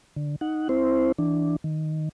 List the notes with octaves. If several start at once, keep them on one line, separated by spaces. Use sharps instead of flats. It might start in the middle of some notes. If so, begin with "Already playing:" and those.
D3
D#4 F#5
C4 E4 C5
E3 D4
D#3